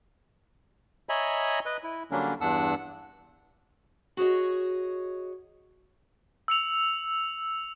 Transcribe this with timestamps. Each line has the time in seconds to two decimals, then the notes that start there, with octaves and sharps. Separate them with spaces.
1.09 C#5 D#5 E5 G#5 A#5 B5
1.66 B4 D#5
1.84 E4
2.11 D3 F#3 G3 A#3 C#4 D4
2.41 E2 G2 D4 F#5 E6
4.17 F#4 G#4 C#5 D#5
6.48 E6 C#7 F7